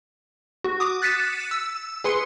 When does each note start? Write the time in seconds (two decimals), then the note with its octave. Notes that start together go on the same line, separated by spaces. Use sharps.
0.64 F#4
0.80 D6 D#6
1.02 F#6 A6 B6 C#7 D#7 E7
1.51 E6
2.04 G#4 B4 C6 C#7